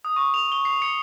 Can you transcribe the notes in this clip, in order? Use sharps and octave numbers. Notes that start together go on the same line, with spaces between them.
D#6
C#6
F7
G7
C7
C#7